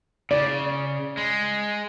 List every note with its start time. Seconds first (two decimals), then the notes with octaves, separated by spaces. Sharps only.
0.31 C#3 D5
1.17 G#3